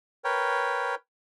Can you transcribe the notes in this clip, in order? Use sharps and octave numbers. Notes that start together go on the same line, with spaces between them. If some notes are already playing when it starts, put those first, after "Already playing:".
A#4 B4 C#5 G5